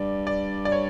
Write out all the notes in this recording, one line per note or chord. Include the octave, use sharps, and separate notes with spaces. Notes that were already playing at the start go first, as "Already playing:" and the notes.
Already playing: G2 D5
D5
D5
C#5